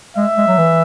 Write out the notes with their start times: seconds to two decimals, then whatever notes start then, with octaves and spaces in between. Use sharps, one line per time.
0.17 G#3 E5
0.37 G#3
0.48 F#3
0.58 E3